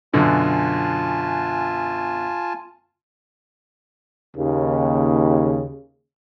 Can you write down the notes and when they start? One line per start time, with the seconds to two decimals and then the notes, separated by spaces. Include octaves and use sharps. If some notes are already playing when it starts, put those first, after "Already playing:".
0.14 F#2 B2 D3 F4 G#5 A5
4.36 D#2 C#3